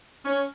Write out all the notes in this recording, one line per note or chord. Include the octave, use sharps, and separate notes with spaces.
C#4